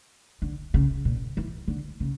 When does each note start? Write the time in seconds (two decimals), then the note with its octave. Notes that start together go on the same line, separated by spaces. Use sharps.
0.42 D3
0.74 C#3
1.05 A#2
1.37 E3
1.68 D3
2.00 C#3